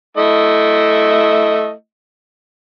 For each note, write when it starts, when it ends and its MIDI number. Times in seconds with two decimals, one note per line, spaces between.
0.17 1.72 57
0.17 1.72 64
0.17 1.72 75